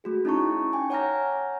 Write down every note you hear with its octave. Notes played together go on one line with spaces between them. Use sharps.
A3 F#4 G#4
C#4 D#4 E4 A5 A#5 C#6
G5 G#5 D6
C#5 F#5 G#5 A#5 F6 A#6